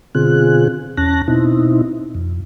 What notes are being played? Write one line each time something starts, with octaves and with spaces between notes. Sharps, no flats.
B2 D3 C4 F4 G#4 F#6
E2 C#4 A5 F#6 A#6
B2 C4 D#4 E4
F2